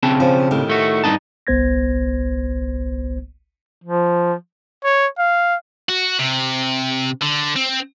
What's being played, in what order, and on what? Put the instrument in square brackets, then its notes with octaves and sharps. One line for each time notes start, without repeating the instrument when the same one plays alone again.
[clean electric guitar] C#3 C4 A5
[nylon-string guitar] F3 C#4
A2 D#3 G4
[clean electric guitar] A3 F#4
G2 D#4 A5
[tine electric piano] G1 C2 B3 C5 G#6 A#6
[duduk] F3
[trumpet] C#5
F5
[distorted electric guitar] F#4
C3
D3
C4